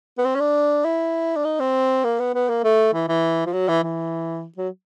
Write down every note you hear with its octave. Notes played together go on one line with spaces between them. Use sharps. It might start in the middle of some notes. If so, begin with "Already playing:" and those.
B3
C4
C#4
D4
E4
D4
D#4
C4
A#3
B3
B3
A#3
A3
E3
E3
F3
F#3
E3
E3
F#3